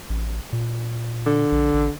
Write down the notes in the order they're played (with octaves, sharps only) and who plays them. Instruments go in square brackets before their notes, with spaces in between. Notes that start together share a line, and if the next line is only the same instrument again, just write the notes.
[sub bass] A1
A#2
[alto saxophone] D3
[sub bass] A#1
A1